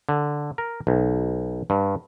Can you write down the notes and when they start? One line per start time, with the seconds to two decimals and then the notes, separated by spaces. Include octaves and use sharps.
0.09 D3
0.58 A#4
0.87 B1
1.70 G2